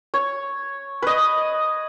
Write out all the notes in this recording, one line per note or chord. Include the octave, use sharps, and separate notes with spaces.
C#5
B4 D#5